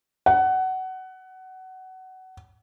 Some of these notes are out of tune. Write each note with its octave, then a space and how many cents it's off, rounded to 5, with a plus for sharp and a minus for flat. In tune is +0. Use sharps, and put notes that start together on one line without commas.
F#5 +20